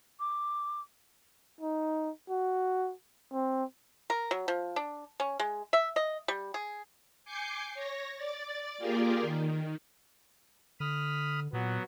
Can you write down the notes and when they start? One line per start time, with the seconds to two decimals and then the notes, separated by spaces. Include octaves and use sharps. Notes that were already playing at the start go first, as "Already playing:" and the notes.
0.20 D6
1.61 D#4
2.29 F#4
3.32 C4
4.10 A#4
4.31 F#3
4.48 F3
4.76 D4
5.20 C#4
5.40 G#3
5.73 E5
5.96 D#5
6.28 G3
6.54 G#4
7.25 G#5 D6 G6 C7 C#7
7.74 C#5 A#6
8.16 D5 A6
8.78 A#3 F4 G4 G#4 A#4 D5
9.22 D#3
10.80 D3 B5 D#6 F6
11.53 A#2 F#3 B3